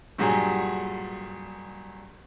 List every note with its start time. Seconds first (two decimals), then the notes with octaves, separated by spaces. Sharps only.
0.18 G2 A#2 F#3 G3 G#4 F#5